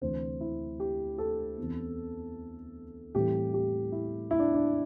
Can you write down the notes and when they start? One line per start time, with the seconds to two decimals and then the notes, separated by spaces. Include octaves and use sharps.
0.01 D2 C3 E3 C5
0.40 E4
0.80 G4
1.18 A4
1.58 E2 E3 C4
3.14 A2 E3 G3 C4 G4
3.54 G4
3.92 E4
4.31 E4
4.39 D4
4.54 D4